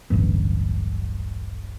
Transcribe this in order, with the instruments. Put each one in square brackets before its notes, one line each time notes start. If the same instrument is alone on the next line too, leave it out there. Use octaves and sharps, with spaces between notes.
[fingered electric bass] D1 A1 G2 B3